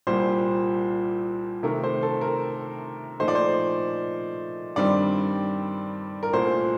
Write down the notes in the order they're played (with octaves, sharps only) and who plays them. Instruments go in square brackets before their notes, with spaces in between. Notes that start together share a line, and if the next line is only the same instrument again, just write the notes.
[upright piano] C2 A#2 G3 C5
C3 D#3 A3 A#4
C5
A4
A#4
A#2 F3 A3 D#4 C5
D5
C5
G2 D#3 G3 C4 D5
A#4
C2 A#2 A3 C5